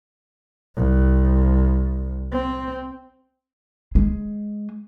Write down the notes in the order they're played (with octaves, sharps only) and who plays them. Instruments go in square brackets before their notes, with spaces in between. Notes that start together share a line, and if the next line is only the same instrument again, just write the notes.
[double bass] C2
C4
[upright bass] G#3